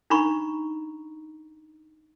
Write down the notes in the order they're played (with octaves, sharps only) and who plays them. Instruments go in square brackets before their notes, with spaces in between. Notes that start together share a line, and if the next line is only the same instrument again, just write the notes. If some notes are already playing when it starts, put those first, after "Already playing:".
[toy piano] D4 D#4 A#5 B5 C#6